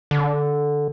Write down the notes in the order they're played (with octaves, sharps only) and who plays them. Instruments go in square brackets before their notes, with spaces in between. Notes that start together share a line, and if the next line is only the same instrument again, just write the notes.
[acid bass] D3